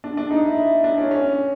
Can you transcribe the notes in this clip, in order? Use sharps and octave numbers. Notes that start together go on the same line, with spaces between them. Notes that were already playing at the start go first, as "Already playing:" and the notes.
D4
D4
D#4
E4
E4
D4
C#4
C#4